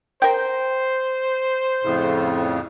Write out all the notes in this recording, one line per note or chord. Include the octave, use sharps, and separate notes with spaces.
A#4 C5 G5
F2 A2 C#3